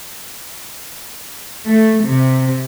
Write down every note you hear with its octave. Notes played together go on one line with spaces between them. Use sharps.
A3
C3